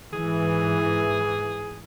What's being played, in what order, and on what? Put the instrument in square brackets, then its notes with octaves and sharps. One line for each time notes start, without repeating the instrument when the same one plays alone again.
[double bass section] G#2 E3 [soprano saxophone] G#4